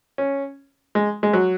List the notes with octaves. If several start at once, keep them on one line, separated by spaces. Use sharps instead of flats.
C#4
G#3
G#3
F#3